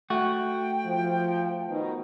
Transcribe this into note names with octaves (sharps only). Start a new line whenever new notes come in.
A3 F#4 G5
F3
B2 D#3 D#4